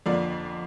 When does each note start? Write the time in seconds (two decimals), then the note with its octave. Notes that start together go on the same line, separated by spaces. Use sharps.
0.06 F2 D3 A#3 F4 D5